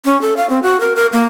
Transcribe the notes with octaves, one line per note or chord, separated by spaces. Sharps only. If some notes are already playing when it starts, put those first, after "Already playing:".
C#4
A4
F5
C4
F#4
A#4
A#4
A#3